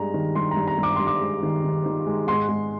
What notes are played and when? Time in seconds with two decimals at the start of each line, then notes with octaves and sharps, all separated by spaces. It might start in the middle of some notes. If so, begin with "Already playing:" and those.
Already playing: G2 G#3 A#5
0.14 D#3
0.35 G2 C6
0.51 A#5
0.57 G2
0.67 A#5
0.78 G2 D6
0.96 G2 C6
1.07 D6
1.21 G#3
1.43 D#3
1.64 D#3
1.86 D#3
2.06 G#3
2.27 G#2 C6
2.49 G#3